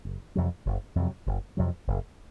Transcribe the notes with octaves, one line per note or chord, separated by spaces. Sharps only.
F#1
F2 C3 F#3
F#1
F2 C3 F#3
F#1
F2 C3 F#3
F#1